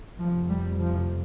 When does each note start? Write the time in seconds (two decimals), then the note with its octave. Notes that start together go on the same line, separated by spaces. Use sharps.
0.19 F1 F2 C3 F3
0.50 G3
0.80 F3